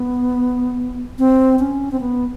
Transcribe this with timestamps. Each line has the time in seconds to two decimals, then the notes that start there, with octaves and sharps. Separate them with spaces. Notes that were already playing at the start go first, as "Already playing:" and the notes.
Already playing: B3
1.19 C4
1.59 C#4
1.92 C4
2.00 B3